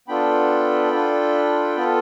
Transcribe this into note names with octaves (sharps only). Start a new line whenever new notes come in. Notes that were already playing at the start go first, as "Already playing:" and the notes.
B3 D4 F4 A4 G5 B5
D4 F4 A4
B3 F4 A4